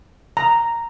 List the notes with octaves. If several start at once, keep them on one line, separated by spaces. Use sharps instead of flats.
A#5